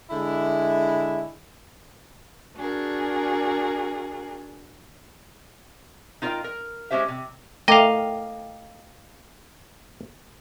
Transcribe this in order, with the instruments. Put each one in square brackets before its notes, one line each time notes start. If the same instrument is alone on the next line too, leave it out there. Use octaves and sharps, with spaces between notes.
[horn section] D3 G#3 E4
[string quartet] D4 F#4 G#4 A#4
[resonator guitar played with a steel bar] D#4 F4 A#4 C#5 D#5 G5
A#4
G#3 C4 C#4 G4 C5 E5
C3
[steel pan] A3 [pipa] A#3 [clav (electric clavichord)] D#5 F5 [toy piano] G5 D6